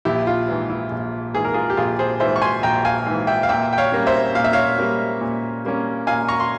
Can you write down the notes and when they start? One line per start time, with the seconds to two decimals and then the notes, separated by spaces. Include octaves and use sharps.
0.05 A#1 E4 G4
0.27 F4
0.48 G#2 E3
0.70 E4
0.91 A#1
1.34 G#2 E3 G#4
1.45 A#4
1.54 F4 G#4
1.70 G4
1.77 A#1 F4 G#4
1.99 G#4 C5
2.20 G#2 E3 C5 E5
2.36 C#6
2.42 G#5 C6
2.63 A#1 G5 A#5
2.85 F5 G#5
3.06 G#2 E3
3.27 E5 G5
3.43 F5
3.49 A#2 E5 G5
3.73 G5
3.78 C#5 F5
3.92 G3 A#3 C#4
4.07 C5 E5
4.35 A#2 F5
4.44 E5
4.53 C#5 F5
4.78 G3 A#3 C#4
5.21 A#2
5.64 G3 A#3 C#4
6.07 A#2 F5 G#5
6.28 A#5 C#6
6.40 C6